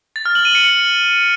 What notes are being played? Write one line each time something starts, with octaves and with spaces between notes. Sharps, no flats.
A6
F6
F#7
D#7
C#7